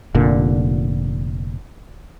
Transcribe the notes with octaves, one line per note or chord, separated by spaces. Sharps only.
F1 A#2 D3